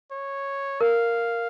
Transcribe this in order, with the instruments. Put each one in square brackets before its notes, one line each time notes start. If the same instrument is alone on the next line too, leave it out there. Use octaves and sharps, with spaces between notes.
[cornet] C#5
[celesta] A#4 [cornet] F5